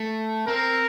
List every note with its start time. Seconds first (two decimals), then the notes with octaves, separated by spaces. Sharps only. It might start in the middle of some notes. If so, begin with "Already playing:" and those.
Already playing: A3
0.47 C4 A#4